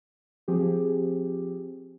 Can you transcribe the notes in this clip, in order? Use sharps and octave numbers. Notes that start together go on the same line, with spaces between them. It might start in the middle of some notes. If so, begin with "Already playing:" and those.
F3 C4 G4 G#4